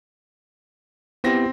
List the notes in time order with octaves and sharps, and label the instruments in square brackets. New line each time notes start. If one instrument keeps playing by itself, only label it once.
[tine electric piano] B3 E4 G4 [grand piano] C4 A#6